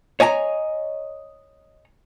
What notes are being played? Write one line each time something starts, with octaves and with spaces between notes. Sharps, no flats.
C#5 D#5 G#5 A#5